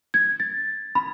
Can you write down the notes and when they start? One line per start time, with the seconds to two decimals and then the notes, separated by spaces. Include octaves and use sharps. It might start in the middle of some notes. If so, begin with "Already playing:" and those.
0.14 G#6
0.40 A6
0.95 B5